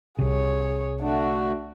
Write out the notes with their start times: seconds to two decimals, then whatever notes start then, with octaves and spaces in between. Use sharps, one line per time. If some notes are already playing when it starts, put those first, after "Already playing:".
0.19 C2 C3 G#4 C#5
1.01 D3 A3 D4 F#4